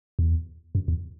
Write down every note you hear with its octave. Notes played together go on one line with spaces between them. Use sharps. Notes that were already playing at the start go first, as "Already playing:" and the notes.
E2
F#2
E2